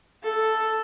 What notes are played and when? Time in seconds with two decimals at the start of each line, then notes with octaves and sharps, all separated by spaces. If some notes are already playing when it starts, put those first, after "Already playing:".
0.23 A4